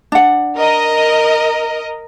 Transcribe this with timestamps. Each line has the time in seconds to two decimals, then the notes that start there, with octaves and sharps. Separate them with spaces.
0.12 D4 F#5
0.57 A#4 D#5